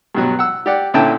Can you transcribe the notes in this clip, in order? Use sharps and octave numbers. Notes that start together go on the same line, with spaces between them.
G2 B2 F#3
F#5 E6
G4 D5 F#5
A#2 D3 C#4 E4 G5 A5